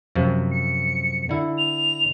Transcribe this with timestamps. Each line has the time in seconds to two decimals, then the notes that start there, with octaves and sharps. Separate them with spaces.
0.15 F#2 C3 F3
0.51 C#7
1.29 D3 E4
1.58 F7